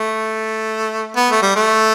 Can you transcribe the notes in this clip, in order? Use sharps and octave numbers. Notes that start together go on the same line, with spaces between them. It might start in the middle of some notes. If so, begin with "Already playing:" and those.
Already playing: A3
B3
A3
G3
A3